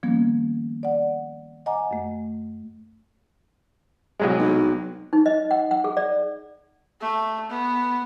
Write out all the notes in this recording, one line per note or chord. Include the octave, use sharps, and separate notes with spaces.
D#3 F3 G3 A#3 B3 C#4
D5 F#5
D#5 F#5 G#5 A#5 D6
F#2 A3
C2 F#3 G#3
B1
D#4
D#5
F#5
F#5
G#4
D5
A3
B3